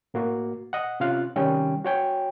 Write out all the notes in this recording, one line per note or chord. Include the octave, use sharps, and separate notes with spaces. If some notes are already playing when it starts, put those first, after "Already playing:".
A2 A#3 F#4
D#5 F#5
C3 C#4 F4 F5 F#6
C3 D#3 G3 C#4 G5
F#4 C#5 G5 G#5